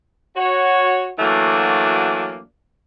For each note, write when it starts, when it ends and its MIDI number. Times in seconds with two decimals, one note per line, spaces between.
0.36 1.09 66
0.36 1.09 73
1.19 2.41 52
1.19 2.41 54
1.19 2.41 57
1.19 2.41 58
1.19 2.41 62
1.19 2.41 66